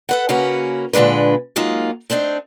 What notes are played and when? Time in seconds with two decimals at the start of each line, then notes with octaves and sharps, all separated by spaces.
0.09 A4 B4 F#5
0.29 C#3 A#3 C#4 F#4 A#4 B4
0.93 A#2 D3 G#3 D4 B4
1.56 F#3 G#3 A#3 D#4 F4
2.10 A3 C4 D4 D#4